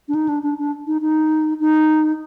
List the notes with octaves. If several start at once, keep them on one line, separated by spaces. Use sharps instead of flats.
D4
D#4
D4
D4
D4
D#4
D#4
D#4